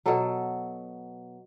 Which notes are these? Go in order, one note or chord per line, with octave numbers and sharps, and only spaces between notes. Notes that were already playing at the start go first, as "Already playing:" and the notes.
B2 F#3 A4